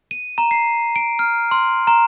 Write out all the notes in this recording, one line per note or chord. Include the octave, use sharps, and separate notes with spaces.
D#7
A#5
C7
D7
F6
C6
A#5